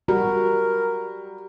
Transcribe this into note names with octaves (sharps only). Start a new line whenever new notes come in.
G3 F#4 A#4